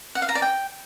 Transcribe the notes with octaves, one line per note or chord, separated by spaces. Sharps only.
F#5
F5
A#5
D5
G5